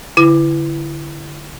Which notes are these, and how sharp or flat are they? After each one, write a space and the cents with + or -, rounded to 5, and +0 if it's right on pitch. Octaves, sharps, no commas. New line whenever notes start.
D3 -20 E4 +15